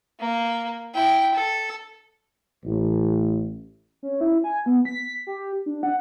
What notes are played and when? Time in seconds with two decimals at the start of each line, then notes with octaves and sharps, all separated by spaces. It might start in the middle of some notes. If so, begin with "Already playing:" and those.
0.20 A#3
0.94 E4 G5
1.34 A4
2.64 A1
4.03 C#4
4.21 E4
4.44 G#5
4.66 B3
4.85 B6
5.27 G4
5.66 D4
5.83 F#5